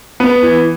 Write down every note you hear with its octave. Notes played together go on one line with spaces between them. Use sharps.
B3
E3